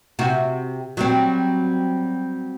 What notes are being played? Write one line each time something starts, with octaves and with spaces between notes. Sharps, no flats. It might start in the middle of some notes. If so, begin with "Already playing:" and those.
C3 F#4
F#3 G3 C4